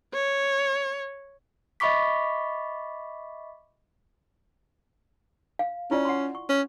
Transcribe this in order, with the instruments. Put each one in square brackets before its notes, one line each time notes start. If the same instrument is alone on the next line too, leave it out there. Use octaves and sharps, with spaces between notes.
[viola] C#5
[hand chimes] D#5 E5 B5 C#6 D6 B6
[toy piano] F5
[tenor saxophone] C#4 [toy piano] E4 F4 D5
[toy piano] F#5 C6
C#6
[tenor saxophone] C#4